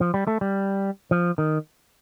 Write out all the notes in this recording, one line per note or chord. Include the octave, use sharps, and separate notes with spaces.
F3
G3
A3
G3
F3
D#3